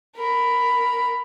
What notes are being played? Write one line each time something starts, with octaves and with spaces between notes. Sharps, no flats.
A#4 B5